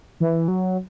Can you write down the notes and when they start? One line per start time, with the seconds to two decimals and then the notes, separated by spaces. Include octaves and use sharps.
0.20 E3
0.48 F#3